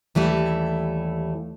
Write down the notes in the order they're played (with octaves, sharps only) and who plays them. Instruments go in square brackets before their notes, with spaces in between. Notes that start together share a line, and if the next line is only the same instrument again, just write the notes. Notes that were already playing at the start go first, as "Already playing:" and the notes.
[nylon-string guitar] D#2 E3 G3 A3